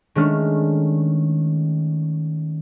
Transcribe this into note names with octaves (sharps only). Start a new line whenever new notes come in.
D#3 G#3 A3 C#4 D4 F6